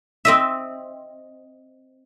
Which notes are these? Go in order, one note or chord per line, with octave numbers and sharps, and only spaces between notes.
C4 D#5 E5